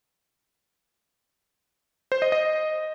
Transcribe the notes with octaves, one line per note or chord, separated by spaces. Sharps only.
C5
D#5
D#5